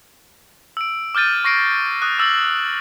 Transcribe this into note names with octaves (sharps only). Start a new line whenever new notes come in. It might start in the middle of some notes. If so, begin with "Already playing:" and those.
E6 D7
D6 F6 G6 A6 D#7
C#6 A#6 C7 D7
D#6 F#6
D6 E6 A6 F#7